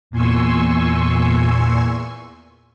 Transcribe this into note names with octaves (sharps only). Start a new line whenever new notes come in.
E2 A#2 G#5 C6 C#6 E6